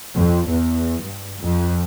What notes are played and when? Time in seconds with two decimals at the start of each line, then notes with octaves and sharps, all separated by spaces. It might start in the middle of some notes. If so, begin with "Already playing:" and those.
0.16 F2
0.48 E2
1.03 G2
1.42 F2